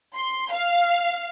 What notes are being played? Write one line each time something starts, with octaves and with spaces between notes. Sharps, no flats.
C6
F5